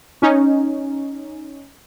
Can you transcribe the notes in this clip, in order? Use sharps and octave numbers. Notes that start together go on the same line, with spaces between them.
C#4 D#4